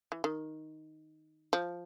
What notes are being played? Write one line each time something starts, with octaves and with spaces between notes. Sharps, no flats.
E3
D#3
F3